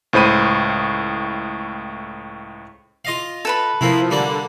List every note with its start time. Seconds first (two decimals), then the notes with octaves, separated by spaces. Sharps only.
0.13 C#2 A2 C5 B5 D#7
3.05 F4 D#5 F5
3.45 A4 B4 B5
3.81 C3 F3 A#3 C4 E4
4.10 D3 G3 A#3 D5